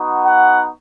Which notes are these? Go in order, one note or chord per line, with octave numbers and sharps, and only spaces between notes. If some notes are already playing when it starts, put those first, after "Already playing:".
Already playing: B3 D#4 F#4
F#5